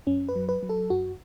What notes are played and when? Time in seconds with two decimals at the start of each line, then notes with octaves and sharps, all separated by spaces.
0.07 F#2 C#4
0.29 B4
0.36 F#3
0.49 B4
0.63 F#3
0.69 A4
0.90 F#2 F#4